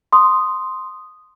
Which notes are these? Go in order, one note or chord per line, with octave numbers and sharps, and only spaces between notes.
C6 D#6